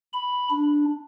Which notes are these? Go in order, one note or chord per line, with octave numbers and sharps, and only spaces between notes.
B5
D4